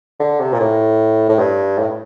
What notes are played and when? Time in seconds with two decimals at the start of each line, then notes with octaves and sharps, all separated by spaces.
0.20 D3
0.40 C3
0.53 A#2
0.60 A2
1.29 A2
1.39 G2
1.79 A2